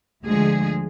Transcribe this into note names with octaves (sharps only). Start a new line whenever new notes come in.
D2 D3 F3 G#3 G#4